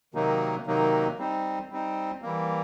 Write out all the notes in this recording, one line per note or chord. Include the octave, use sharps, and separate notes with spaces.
C3 D#3 F#3 A#3 D#4
C3 D#3 F#3 A#3 D#4
G3 C4 D#4
G3 C4 D#4
E3 G3 A#3